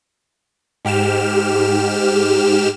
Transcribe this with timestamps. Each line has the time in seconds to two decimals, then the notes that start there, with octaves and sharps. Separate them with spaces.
0.85 G#2 G4 F6 E7